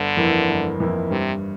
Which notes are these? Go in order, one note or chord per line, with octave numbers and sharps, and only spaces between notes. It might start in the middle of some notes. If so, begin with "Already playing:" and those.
Already playing: G1 D3
F2 E3 A#3 E4
G1
F2 E3 A#3 E4
G2 C3